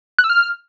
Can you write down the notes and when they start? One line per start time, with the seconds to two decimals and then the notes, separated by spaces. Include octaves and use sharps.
0.19 F#6
0.24 E6
0.30 F6